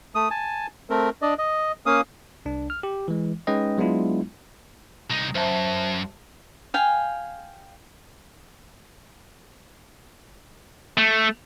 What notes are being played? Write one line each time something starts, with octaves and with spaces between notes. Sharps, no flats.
A3 D#6
G#5 A5
A3 C4 A#4
D4 D5 D#5
D#5
A#3 C#4 F5 D#6
C2 D4
F6
G4
E3 G#3
G#3 C#4 D#4 B4 D#5 G5
F#3 G#3 B3 D4 E4 F4
C2 D#4
F#2 C5 E5 A5
F5 G5 G#5
A3